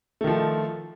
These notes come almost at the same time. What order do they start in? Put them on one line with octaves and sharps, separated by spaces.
A3 D#3 F3